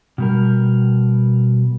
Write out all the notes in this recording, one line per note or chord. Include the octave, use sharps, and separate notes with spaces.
B2 G3 A#4